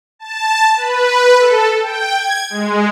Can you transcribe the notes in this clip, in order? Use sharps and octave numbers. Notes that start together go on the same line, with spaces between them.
A5
B4
A4
G5
G#6
G#3